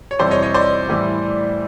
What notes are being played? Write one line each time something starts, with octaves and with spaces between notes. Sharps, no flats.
C#5
F2 C3 E3 G3 C5 D5
C#5 D#5
C#5 D#5
C5 D5
A2 E3 G3